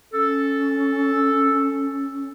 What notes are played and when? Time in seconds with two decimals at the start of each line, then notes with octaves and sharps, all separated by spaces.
0.14 C#4 A4